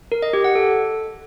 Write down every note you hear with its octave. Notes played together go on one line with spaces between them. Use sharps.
A#4
D#5
G4
F#5
A4